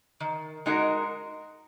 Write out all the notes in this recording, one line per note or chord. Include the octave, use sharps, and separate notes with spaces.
D#3
G#3 D#4 F#4 A#4